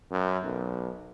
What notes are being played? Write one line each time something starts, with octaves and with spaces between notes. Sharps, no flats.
F#2
B1